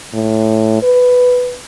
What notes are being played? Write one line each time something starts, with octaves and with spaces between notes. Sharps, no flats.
A2
B4